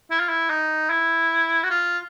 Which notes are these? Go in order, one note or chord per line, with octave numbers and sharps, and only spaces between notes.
E4
F4
E4
D#4
E4
F#4
F4